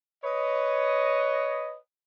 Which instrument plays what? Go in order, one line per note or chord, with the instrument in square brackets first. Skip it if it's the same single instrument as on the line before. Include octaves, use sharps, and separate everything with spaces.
[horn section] B4 C#5 D#5